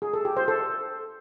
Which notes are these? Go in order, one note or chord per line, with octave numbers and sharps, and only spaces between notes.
G#4
A4
G4
C5
A4